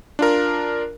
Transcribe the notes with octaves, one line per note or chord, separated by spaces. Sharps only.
D4 F4 A#4